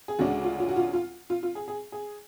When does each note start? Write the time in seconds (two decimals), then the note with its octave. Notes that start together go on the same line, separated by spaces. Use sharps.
0.08 G#4
0.19 D2 C#3 G#3 D4 F#4
0.44 F4
0.60 F4
0.68 F#4
0.76 F4
0.93 F4
1.30 F4
1.43 F4
1.55 G#4
1.68 G#4
1.92 G#4